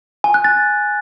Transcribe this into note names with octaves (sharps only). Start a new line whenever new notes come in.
G#5
F#6
A6